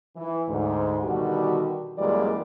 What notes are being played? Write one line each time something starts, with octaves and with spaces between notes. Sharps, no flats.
E3
D2 G#2
B2 D3 D#3 G3 F#4
F#2 A#2 E3 G3 G#3 D5